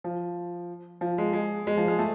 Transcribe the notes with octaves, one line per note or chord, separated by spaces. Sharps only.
F3
F3
G#3
G#3
G#3
F3
G#3
A3